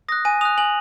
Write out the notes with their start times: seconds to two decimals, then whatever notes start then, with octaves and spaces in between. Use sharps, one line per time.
0.09 D#6 F#6 A#6
0.25 G#5 D#7
0.41 D#6 F#6 F7
0.58 G#5 F#7